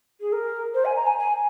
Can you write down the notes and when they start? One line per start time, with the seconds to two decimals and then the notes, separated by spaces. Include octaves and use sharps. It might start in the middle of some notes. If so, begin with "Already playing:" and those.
0.20 G#4
0.32 A#4
0.74 C5
0.85 G#5
0.96 A#5
1.06 G#5
1.18 G#5